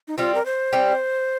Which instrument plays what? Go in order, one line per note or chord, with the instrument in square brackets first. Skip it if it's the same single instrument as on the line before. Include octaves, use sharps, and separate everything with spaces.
[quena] D#4
[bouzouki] G3 C4 G4 [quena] F4
[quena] A#4
C5
[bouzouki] G3 C4 G4